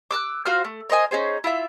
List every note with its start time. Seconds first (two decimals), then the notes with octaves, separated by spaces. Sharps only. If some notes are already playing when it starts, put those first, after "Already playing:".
0.11 D6 E6 F#6
0.46 F4 F#4 C5 F6
0.65 A3
0.90 A#4 C5 D#5 G#5
1.11 C#4 D#4 G#4 C5
1.44 E4 F4 E5